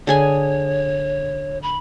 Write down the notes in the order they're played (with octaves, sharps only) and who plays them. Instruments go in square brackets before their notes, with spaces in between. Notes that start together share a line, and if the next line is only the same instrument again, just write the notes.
[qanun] D3 G#4 G#5 [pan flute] C#5
[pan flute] B5